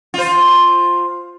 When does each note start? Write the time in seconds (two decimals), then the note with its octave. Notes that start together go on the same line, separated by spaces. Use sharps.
0.14 F4 C5